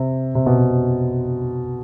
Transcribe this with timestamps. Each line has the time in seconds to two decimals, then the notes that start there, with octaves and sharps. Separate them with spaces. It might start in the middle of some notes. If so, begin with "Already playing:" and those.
Already playing: C3
0.35 C3
0.46 B2
0.58 C3